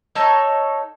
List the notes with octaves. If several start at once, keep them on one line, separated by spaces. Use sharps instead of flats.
D#4 A4 C#5